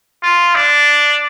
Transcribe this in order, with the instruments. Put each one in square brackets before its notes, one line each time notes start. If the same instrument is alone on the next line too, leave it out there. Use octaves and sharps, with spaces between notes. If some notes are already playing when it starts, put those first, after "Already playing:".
[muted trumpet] F4
D4